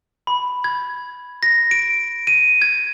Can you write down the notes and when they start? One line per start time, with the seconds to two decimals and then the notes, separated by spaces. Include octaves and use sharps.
0.27 B5
0.64 G#6
1.43 A#6
1.71 D7
2.27 D#7
2.62 G#6